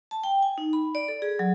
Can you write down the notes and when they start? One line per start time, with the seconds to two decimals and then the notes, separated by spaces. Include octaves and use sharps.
0.11 A5
0.24 G5
0.42 G#5
0.58 D#4
0.73 B5
0.95 D5
1.08 A4
1.22 G#4
1.39 F#3